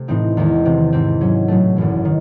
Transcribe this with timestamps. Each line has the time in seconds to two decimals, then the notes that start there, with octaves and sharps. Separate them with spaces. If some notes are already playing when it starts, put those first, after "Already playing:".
Already playing: C3 A3
0.08 A2 E3 C4 D#4
0.37 E2 D#3 G#3
0.65 C3 E3 C4
0.93 G#2 E3 C4
1.21 G#2 F#3 C#4
1.48 A2 F#3 A3
1.76 G#1 F#2 E3
2.05 D#3